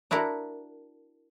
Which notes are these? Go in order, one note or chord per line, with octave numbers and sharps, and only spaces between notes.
D4 E4 F#4 A#4